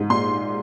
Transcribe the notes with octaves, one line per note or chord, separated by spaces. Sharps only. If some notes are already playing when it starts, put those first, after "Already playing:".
Already playing: G#2
A#2 C6